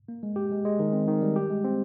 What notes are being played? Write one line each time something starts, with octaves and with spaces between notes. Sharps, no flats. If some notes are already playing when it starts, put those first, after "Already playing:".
A#3
G#3
G4
G#3
G#3
D#3
C4
D#3
G3
G4
G#3
C4